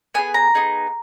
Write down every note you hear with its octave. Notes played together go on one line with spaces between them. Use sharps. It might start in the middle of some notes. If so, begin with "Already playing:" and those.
B3 D#4 G#4 G#5
A#5
B3 D#4 G#4